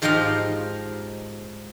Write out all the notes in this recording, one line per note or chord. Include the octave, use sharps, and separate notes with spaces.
G#2 F3 D#4 G4 D#5 F5